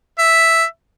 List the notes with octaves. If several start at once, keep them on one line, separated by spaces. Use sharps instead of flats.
E5